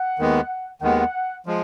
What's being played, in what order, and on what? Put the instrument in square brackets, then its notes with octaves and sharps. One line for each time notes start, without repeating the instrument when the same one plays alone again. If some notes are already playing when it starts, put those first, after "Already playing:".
Already playing: [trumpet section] F#5
[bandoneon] D#2 D#3 G#3 B3
[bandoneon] D#2 D#3 G#3 B3 [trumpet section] F#5
[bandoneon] F3 G#3